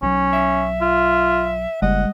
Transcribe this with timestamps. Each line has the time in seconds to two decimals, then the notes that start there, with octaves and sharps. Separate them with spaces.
0.02 B1 F#3 C#4
0.33 E5
0.81 F4
1.82 F#1 G3 G#3 D#5 F#5